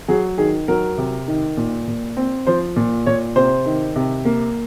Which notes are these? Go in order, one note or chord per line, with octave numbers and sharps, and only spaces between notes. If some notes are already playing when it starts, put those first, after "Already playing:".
F#3 G#4
D#3 G#4
F#3 A#4
C3
D#3
A#2
A#2
C4
F3 C5
A#2
A#2 C#5
C3 C5
D#3
C3
A#3